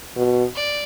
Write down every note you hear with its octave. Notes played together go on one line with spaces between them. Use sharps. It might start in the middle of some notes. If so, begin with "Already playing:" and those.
B2
D5